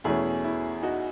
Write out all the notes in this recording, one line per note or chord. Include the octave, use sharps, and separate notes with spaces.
E2 B2 A3 C#4 E4 G#4
E4
D#4 F#4